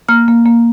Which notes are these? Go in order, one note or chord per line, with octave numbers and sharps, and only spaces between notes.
A#3 F6
A#3
A#3